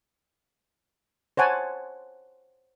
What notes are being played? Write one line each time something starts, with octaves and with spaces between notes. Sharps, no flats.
C5 C#5 F#5 G#5 A5